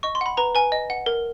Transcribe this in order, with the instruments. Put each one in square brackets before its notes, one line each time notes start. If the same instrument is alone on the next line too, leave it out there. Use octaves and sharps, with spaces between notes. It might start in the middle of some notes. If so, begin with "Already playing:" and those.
[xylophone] D#5 C#6
C6
F#5 B5
B4 A#5
B4 G#5
D#5
F#5
A#4